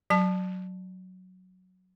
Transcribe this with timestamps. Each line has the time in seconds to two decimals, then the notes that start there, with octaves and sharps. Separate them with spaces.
0.10 F#3 A5